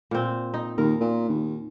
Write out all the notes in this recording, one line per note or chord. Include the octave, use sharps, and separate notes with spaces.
A#2 C4
D#4
D#2 A#4
A#2
D#2